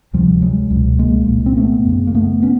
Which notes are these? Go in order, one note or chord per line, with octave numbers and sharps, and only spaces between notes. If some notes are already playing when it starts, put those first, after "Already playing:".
D2 C3 F3 G3
F#3 G#3
C#2
B2
G#3 A#3
C2 A#2
C4
A3 B3
F#2 C#3
A#3
A3 B3
B3 C#4